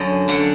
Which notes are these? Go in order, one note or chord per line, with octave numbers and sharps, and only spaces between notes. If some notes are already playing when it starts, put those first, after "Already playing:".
Already playing: F#2 D3 D#5
F#2 D3 F#5